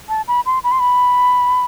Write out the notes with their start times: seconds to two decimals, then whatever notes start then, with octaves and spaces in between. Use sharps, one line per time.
0.09 A5
0.28 B5
0.46 C6
0.64 B5
0.72 C6
0.79 B5